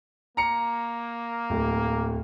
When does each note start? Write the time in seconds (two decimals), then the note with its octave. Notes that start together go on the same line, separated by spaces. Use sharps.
0.37 A#3 A#5 C#7
1.50 D1